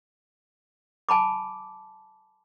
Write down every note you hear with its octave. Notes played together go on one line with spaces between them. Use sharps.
G#5 A5 B5 D6